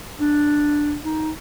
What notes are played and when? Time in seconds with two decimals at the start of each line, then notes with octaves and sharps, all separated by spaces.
0.19 D4
1.05 D#4